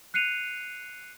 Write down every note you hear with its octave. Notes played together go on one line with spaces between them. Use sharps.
F#6 C7 C#7 D#7 F7